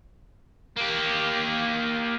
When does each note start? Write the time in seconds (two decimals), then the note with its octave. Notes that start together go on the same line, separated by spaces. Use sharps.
0.76 A#3 G4